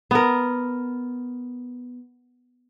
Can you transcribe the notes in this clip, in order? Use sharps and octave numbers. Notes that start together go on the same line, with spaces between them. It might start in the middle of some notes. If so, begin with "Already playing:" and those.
B3 A#4